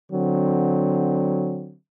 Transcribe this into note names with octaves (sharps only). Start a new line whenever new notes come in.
D3 F#3 C4